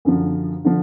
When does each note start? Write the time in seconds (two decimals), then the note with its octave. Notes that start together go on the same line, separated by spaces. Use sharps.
0.05 F#2 D3 F3
0.64 D3 F3